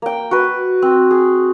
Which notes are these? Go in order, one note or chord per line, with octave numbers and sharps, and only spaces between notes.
A#3 G5
F#4 B4
C4
G#4